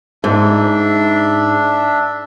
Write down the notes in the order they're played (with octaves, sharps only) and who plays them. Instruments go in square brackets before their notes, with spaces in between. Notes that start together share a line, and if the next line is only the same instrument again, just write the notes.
[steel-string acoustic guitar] G#2 [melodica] D4 E5